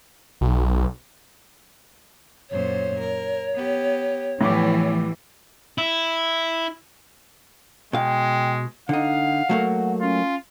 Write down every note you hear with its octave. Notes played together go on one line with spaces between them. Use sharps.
B1
F#2 A#2 C5 C#5
A#4
B3 G4
A2 E3 F3 G3 B3 D6
E4
B2 G#3 F5 G5
D3 D#4 F5 F#5
F#3 A3 A#3
C#4 F4